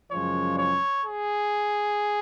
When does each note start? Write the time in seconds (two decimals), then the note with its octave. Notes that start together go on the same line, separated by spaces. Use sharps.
0.12 F#2 C#3 F3 G#3 C#5
0.58 C#5
1.05 G#4